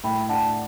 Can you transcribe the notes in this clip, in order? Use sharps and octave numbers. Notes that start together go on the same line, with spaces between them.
A2 G5 B5
D4 F#5 A5